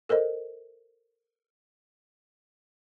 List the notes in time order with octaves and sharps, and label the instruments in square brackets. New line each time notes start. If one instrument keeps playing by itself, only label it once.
[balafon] A4 A#4 C5 D#5